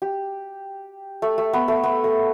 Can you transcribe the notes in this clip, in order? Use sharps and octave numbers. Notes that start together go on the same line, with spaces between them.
G4
A3
A3
B3
A3
B3
A3